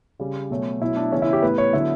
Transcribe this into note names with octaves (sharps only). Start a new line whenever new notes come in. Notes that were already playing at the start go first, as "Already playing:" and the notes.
C#3 G3 C#4
B2 F#3 A3 C#4
B2 F#3 A3 E4
D4
C#3 E3 B3 C#4
E4
G4
A2 E3 B3 B4
C#5
D3 F#3 B3 E4